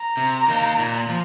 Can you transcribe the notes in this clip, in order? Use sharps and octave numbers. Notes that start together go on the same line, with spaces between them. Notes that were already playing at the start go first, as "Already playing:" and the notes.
Already playing: A#5
C3
D#3 A#3 D#4
A#2
F3